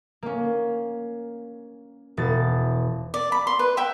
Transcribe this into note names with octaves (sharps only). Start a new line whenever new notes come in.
A#3 C#4
E1 A6
D5
B5
C6
B4
E5 G5